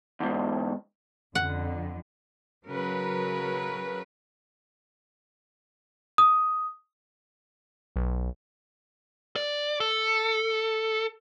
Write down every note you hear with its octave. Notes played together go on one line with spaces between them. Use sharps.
E2 G#2
F2 D3 F#5
C#3 F#3 A#4 B4
D#6
B1
D5
A4